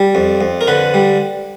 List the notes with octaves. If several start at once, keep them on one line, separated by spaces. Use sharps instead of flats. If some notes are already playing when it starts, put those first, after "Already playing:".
Already playing: G3
F2
F2
A#4
D3 B4
G3